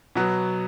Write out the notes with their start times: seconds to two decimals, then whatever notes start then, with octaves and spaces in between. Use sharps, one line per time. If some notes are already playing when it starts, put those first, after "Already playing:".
0.16 B2 F#3 B3